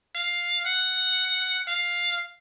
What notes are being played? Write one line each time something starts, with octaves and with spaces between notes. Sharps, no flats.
F5
F#5
F5